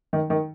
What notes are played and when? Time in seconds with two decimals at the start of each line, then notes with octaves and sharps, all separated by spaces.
0.13 D#3
0.30 D#3